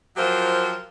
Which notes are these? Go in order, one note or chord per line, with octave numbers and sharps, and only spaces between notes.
F3 F#3 F4 G4 A#4 C5